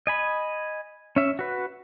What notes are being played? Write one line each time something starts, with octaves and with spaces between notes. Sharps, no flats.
D#5 G#5 B5
C#4 E5
F#4 B4